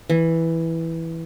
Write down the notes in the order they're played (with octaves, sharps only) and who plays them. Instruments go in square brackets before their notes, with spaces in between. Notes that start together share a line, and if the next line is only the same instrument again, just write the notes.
[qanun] E3